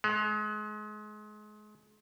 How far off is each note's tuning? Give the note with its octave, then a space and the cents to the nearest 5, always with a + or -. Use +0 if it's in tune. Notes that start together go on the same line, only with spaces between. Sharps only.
G#3 +30